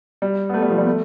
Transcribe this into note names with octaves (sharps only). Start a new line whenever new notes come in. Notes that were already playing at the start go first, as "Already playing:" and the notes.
G3
B3
A3
G3
F3
G3
A3